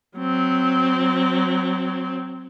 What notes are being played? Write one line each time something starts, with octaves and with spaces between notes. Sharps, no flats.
F#3 C4